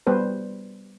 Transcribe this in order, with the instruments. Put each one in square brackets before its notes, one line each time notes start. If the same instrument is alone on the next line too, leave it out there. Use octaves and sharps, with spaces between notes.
[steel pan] G3 B3 B4 C5